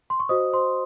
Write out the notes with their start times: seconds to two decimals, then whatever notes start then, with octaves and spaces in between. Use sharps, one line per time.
0.10 C6
0.20 C#6
0.29 F#4 C5 D#5 D#6
0.53 C5 C6